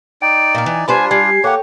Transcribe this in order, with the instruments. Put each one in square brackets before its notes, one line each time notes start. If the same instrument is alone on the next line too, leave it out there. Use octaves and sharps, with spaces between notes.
[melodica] D#4 D5 [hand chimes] G5 [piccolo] D7
[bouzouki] A#2 A#4
[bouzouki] E3 [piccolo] G#5
[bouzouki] G3 B4 C5 [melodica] D4 F4 [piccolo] G#5 [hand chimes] B5 C7
[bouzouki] G3 [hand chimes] G#5 G#6 [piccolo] C7
[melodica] A#3 G4 F#5 [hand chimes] A4 G5 [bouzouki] C#5